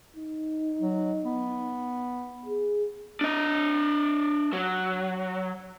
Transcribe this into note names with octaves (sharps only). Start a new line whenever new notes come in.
D#4
F#3
B3
G#4
D4 D#5
F#3